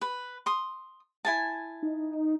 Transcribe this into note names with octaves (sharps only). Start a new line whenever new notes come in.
B4
C6 D#6
E4 G#5 A5
D#4